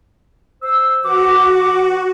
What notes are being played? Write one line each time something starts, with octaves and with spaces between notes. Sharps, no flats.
C5 E6
E3 F#4 B4 D6